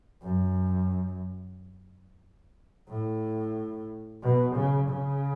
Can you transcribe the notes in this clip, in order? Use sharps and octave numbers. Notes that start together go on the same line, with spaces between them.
F#2
A2
B2
C#3
C#3